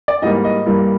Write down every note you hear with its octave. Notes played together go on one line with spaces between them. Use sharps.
D5
G#2 E3 G3 A#3 D#5
D#5
G2 E3 G3 A#3